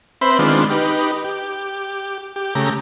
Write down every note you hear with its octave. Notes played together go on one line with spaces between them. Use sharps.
C4 B4 C5 E5 B5
D#3 G#3 B3 C4 D4 F4
D#4 G4 B4
G4
G4
C#3 A3 G4 A#5